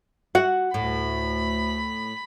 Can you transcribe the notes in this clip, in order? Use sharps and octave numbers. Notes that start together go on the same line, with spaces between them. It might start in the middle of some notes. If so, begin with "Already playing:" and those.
F#4 F#5
D2 A2 B5